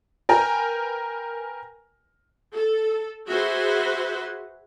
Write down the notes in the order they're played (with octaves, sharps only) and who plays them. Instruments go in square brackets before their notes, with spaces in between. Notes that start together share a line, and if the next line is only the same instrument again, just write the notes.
[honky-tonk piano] A#4 B4 G5 G#5 A#5
[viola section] A4
F#4 G#4 B4 C5 E5 F#5